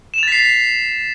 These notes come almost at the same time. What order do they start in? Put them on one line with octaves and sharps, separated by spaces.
E7 F7 A6 B6 C7